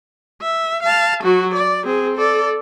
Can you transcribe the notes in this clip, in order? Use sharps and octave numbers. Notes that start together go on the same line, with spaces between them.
E5
F5 A5
F#3 F#4
D5
C4 G#4
A4 D5